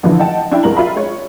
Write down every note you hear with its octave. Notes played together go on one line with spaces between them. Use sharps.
A#1 D3 E3 F3 E4
D#4 F#5 G5 A5
D4 E4 G5
C2 G#2 A#4 A#5 F#7
F4 E5 B5
G#3 C#5